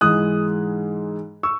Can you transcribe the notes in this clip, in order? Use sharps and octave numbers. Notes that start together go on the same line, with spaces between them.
G#2 E3 G#3 D#6 F#6
C#6 E6